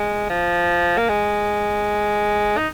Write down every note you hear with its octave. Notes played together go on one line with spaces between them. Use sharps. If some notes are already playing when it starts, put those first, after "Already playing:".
Already playing: G#3
F3
A#3
G#3
D#4